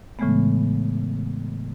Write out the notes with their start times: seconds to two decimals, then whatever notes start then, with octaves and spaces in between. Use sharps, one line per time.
0.19 A2 C#3 E3 G#3 A3 B3